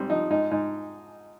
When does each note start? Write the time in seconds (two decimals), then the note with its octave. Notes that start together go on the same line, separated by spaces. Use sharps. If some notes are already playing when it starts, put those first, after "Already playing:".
Already playing: G#1 G#2 G3 C4
0.10 F3 D#4
0.30 G#2 D#4
0.51 G#2 D#4